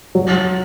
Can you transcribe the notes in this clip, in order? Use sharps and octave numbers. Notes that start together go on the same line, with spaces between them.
F#3